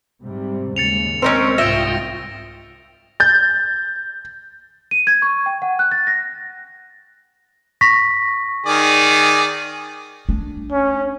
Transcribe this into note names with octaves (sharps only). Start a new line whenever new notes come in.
G#2 C3 G3
D#2 C#3 G#3 A6 C#7 F7
C4 C#4 D#4 A#4 C5
C2 G#2 F4 E5 G5 D#6 A#6 D7
G6 A6
D#7
G#6
C#6
G5
F#5
F#6
A6
A#6
C#6 A#6 B6
D#3 G#4 D5
A3 D4
C#4